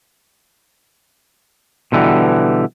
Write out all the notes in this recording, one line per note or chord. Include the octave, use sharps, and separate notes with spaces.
B2 D3 E3 G3